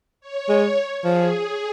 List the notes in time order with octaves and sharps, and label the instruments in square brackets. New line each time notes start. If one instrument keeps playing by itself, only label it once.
[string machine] C#5
[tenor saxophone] G#3
[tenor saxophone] F3 [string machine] G#4